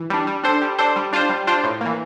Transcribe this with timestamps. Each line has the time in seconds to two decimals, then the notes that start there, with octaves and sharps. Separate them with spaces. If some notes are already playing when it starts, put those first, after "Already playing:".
Already playing: E3
0.10 G3 D4
0.27 G3
0.44 D4 A4 C5
0.62 G3
0.78 D4 A4 C5
0.96 G3
1.13 D4 F4 C5
1.29 G3
1.47 D4 F4 C5
1.64 A2
1.81 E3 A#3